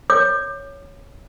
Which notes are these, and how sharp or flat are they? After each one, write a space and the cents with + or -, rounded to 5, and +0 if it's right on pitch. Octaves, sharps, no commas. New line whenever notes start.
C#5 +5 D6 +35